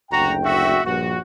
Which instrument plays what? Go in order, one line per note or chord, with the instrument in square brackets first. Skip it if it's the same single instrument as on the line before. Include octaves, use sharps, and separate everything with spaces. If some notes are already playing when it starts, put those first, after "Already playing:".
[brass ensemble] F#1 D2 G5 [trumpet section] F#4 A#5
[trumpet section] F#4 E5
[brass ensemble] A#1 G2 [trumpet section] F#4